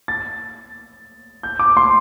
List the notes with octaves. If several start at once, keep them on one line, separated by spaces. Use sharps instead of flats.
A6
G6
D6
C6